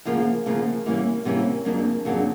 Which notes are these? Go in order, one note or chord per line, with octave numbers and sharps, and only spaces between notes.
D2 C#3 F3 A#3
D2 C#3 F3 A#3
C3 E3 G3 A#3 C#4
C3 E3 G3 A#3 C#4
F2 C#3 F#3 A#3 D4
F2 C#3 F#3 A#3 D4